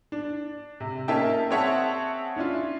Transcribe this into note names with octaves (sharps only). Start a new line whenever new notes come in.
D4
C3
A#3 C#4 D#4 E5 G5 A5
C4 G#4 C#5 E5 F#5 A5
C#4 D4 E4 F4